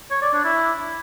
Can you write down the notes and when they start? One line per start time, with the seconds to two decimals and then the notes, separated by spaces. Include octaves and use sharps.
0.11 C#5
0.22 D5
0.33 D4
0.44 E4